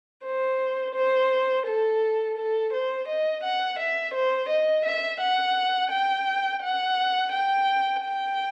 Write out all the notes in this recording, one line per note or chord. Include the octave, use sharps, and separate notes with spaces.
C5
C5
A4
A4
C5
D#5
F#5
E5
C5
D#5
E5
F#5
G5
F#5
G5
G5